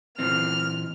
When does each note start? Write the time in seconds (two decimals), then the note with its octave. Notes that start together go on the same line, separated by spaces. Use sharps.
0.19 A#2 E3 C4 F6